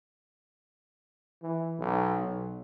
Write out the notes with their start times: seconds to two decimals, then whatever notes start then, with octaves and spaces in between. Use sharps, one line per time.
1.43 E3
1.79 B1
2.18 B1